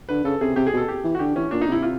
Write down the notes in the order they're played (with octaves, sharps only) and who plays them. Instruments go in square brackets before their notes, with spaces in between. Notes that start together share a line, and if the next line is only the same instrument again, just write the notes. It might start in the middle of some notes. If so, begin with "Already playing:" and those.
[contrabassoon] D3 [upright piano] B4
[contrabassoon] C#3 [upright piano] A4
[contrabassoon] C3 [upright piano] G#4
[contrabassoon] C3 [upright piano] G4
[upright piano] G#4
[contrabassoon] B2 [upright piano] A4
[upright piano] G4
[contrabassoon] E3
[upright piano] F#4
[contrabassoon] D3 [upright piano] G4
[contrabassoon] E3 [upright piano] C#4
[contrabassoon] A#2 [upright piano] D4
[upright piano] D#4
[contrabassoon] C3 [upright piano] E4
[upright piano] F4